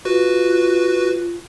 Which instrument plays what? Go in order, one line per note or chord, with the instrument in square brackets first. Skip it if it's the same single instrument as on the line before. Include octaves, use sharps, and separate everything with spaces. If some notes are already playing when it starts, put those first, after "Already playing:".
[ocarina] F4 [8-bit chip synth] F#4 B4